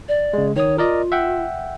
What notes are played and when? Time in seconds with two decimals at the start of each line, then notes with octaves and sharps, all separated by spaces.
0.08 D5
0.33 C#3 G#3
0.56 D#3 C#5 D#6
0.78 F4 A#4 D5 D#5
1.12 E5 F#5 G5